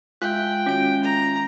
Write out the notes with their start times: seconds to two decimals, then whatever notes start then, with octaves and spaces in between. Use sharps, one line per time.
0.22 G#3 F4 E5 G5 F#6
0.66 D#3 G#3 C#4 F#4 D7
1.04 A#5